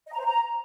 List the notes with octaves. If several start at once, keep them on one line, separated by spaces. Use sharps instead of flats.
D#5
A#5
C5
A#5